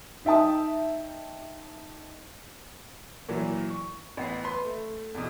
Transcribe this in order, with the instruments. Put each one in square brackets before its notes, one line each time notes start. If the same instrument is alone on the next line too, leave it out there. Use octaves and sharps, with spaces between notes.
[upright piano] D#4 E5 G5 A5 D#6
A#2 E3 F#3
C#6
A1 B3 C7
B4 B5 C6
A3
E2 B2